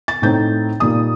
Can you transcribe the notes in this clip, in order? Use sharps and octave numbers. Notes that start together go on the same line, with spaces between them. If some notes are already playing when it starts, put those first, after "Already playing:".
A6
A2 A3 C4 D#4 G6
A#2 G3 A#3 D#4 D#6